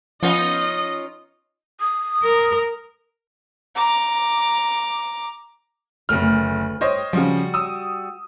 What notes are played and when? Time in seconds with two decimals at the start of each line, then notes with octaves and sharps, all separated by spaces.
0.22 F3 B3 C#4 D#4 F4 D#5
1.80 D#6
2.23 A#4
3.75 A#5 D6
6.09 F#1 D2 A3 B4 F6
6.81 G2 G4 C5 C#5 D#5
7.13 C#3 F3 G3 F#4
7.54 D#6 E6